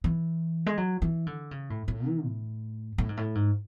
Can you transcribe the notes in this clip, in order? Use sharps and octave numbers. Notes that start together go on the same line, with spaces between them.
E3
G#3
F#3
E3
D3
C#3
A2
A2
E3
A2
A2
G#2
A2
G#2